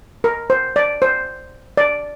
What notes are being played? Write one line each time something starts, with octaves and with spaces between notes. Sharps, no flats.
A#4
C5
D5
C5
D5